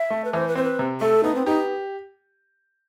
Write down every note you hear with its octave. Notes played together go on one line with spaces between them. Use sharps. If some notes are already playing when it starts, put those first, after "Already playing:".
Already playing: E5
A3
B4
E3 C5
B4
C4 C5
B4
C3
A3 A4
B3 D#4
C4
D#4 G4